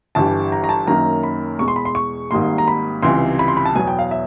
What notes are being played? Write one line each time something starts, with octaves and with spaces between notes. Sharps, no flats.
G1 G2 E3 G3 A5
A#5
A#5
A5
F#2 D#3 F#3 A#3 A#5
B5
E2 B2 G#3 C#6
C6
B5
C6
C#6
G#1 G#2 D#3 G3 A#3 C6
A#5
B5
C#2 C3 E3 G3 C6
B5
C6
B5
A5
E2 B2 F#3 B3 G#5
G5
F5
E5